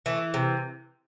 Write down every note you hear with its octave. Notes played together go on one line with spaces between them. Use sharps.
E3 A3
C3